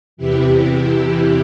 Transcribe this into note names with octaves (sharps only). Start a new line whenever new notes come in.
E2 C3 E3 E4 G4